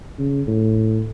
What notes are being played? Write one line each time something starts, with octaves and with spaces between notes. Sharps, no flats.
C#3
A2